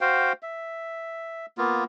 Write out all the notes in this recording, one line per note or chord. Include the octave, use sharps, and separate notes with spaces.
F#4 C5 F5 G5
E5
A#3 B3 F4